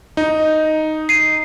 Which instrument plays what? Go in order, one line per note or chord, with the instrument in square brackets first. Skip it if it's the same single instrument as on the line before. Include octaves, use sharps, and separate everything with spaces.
[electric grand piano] D#4
[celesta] C7 D#7